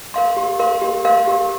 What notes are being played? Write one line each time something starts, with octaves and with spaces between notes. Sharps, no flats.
A#4 F5 C6
G4
A#4 F5 C6
G4
A#4 F5 C6
G4